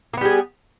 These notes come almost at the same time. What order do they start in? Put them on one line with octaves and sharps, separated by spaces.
A#3 B3 G3 G#4